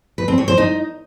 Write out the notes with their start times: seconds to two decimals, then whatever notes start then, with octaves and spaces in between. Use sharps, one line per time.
0.18 B4
0.28 C4
0.38 C#5
0.48 C5
0.58 D#4